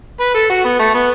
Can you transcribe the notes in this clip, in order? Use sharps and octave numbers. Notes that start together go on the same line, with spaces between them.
B4
A4
F#4
B3
A3
B3